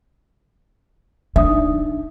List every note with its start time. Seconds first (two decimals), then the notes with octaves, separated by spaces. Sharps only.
1.36 D4 E5 D#6
1.48 D#4